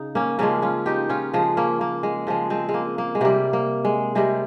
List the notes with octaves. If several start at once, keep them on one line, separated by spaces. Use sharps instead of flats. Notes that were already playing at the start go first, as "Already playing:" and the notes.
Already playing: C#3 D#4
A#3 C#4
C#3 F3 G#3 A#3 C#4
C#4 F4
D#4 G4
C#4 F4
C#3 F3 G#3
A#3 C#4
A#3
G#3
C#3 F3 G#3
G#3 C4
G#3
A#3
A#3
G#3
C3 G3 A#3
A#3
G#3
C3 G3 G#3